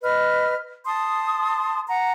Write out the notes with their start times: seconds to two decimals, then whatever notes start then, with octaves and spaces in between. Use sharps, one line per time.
0.02 B4 D#5 F6
0.86 A5 C6 D#6
1.88 F#5 A#5